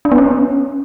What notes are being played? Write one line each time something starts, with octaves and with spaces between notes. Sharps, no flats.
D4
B3
C#4